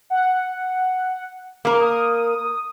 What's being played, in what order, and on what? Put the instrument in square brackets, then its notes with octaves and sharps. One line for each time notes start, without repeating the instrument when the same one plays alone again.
[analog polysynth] F#5
[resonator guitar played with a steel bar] A#3 A#4
[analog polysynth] D#6